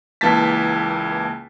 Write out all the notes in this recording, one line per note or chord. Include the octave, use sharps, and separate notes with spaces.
C#2 E3 A#3 A5 A6 B6